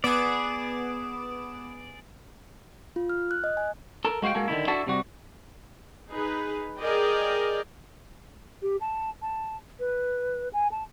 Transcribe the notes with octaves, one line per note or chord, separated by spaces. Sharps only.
B3 G#4 D5 D6 E7
F4
F6
F#6
D#5
G#5
A4 A#4
G#3 F#4 C5 F5 G5
G#3 A#3 C#4 F#4 A4
D3 D#3 D#4 E4
D4 E4 F#4 A4 E5
C3 G3 F#4
D#4 G#4 B4
G#4 A#4 D5 D#5 G5
G4
A5
A5
B4
G#5
A5